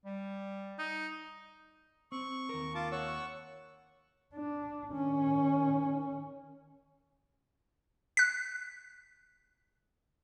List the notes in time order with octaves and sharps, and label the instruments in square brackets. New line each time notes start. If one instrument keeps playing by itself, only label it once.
[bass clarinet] G3
[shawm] D#4
[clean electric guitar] C4 [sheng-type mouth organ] C#6
[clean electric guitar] D#2 A#4
[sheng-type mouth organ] F4 A5 D6
[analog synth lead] C#5 [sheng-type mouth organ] F#5 C#6 E6
[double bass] D4
D#3 C#4
[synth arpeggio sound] F#6 B6